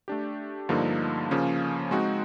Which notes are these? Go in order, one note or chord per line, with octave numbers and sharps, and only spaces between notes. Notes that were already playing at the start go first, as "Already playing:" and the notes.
A3 D4 G4
G2 D3 F3 A#3 D#4
C#3 F3 A#3 C#4
G#3 C4 D#4 F#4